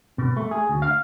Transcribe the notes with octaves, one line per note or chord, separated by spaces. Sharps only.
B2
A3
G#4
D2
F5